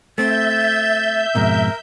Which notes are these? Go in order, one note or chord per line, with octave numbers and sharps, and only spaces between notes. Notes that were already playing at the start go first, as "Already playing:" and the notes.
A3 C4 E5 G6 A6
F2 G#2 B2 A#4